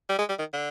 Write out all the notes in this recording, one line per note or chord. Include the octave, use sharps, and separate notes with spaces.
G3
G#3
G3
D#3
D3